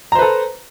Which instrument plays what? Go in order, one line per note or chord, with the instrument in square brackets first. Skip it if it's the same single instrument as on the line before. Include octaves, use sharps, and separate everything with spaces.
[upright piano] A#5
C5
B4
A4